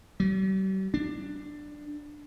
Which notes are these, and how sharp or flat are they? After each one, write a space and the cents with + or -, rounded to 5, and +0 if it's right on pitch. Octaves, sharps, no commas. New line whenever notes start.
G3 -45
D4 +10